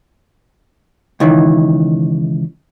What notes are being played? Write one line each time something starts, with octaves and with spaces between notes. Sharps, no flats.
C#2 D#3 E3